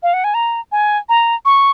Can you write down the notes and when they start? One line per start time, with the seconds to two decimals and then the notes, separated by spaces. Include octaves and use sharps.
0.03 F5
0.13 F#5
0.24 G#5
0.34 A#5
0.72 G#5
1.09 A#5
1.45 C#6